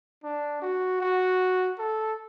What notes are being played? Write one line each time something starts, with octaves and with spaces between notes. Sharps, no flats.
D4
F#4
F#4
A4